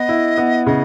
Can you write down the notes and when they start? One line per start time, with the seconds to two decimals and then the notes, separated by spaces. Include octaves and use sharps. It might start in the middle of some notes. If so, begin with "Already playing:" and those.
Already playing: B3 D#5
0.09 E4
0.38 B3
0.67 C#3 D#5